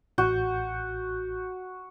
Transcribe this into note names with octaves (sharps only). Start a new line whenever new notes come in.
A1 F#4 G6